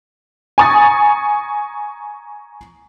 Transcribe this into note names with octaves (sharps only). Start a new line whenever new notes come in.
G#5 A#5 C#6 D#6 A6